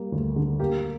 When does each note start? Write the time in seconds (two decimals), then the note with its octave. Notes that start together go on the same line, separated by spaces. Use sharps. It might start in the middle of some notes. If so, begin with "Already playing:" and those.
Already playing: G3 A#3
0.12 D2
0.36 D3
0.59 A#3 G4